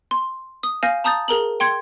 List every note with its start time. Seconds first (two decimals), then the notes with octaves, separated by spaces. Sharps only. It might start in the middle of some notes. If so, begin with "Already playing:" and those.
0.11 C6
0.63 D#6
0.83 F5 G#5 F6 G6 A#6
1.04 A5 A#5 D#6 G6 A6
1.28 G#4 A#4 A#5 F#7
1.60 G5 C6 G#6 C#7